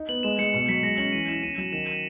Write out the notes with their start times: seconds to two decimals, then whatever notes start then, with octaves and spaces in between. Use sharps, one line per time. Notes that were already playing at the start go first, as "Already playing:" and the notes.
Already playing: D#4
0.09 B3 F#7
0.23 G#3 E7
0.39 G#3 C#7
0.54 B2 C#7
0.68 F#3 B6
0.83 G#3 A#6
0.98 C#4 F#7
1.13 E3 D#7
1.27 E4 E7
1.43 C#4 D#7
1.58 F#3 E7
1.72 D#3 E7
1.87 D#7